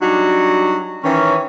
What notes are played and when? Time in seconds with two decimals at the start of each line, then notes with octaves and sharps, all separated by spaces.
0.02 F#3 G3 D4 D#4 F#4
1.04 D#3 E3 C#4